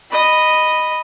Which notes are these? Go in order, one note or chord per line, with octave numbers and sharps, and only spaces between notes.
D#5 B5